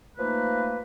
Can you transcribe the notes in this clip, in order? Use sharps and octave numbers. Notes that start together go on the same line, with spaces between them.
F3 A3 A#3 D#4 B4